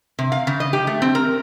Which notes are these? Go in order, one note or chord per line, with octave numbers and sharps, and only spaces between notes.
C3
F5
C#3
D#5
G4
A3
C4
A#4